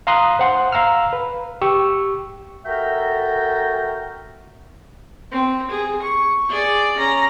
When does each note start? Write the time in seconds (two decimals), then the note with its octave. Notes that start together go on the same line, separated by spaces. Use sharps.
0.07 F5 A#5 C6 D#6 F#6
0.39 C5 F#5 C6
0.72 F5 A#5 E6 F6
1.13 B4
1.62 G4 C#6 E6
2.65 F#4 A4 A#4 E5 G5 A#5
5.31 C4
5.71 G#4
6.02 C#6
6.49 G#4 D5
6.98 C#4 A#5